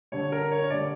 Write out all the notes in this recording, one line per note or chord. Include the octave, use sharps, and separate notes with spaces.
D3 G3 C#5
A#4
C#5
D3 G3 D5